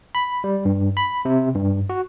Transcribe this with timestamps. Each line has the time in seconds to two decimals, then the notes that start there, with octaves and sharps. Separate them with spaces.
0.15 B5
0.44 G3
0.65 G2
0.97 B5
1.25 C3
1.55 G2
1.90 F#4